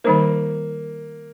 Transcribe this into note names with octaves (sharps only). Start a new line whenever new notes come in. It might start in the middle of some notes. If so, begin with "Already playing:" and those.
D#3 G3 A#3 D#4 C5